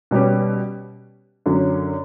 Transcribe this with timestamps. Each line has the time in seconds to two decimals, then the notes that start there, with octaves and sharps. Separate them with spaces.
0.11 B2 G3 C#4 G4 B4
1.46 F#2 D3 F#3 C#4